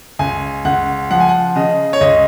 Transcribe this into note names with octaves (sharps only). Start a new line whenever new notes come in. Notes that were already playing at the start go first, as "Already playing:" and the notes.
C#2 G#5
C#2 F#5
F3 F#5
G#5
F#5
C#3 D#5
C#5
C#2 D#5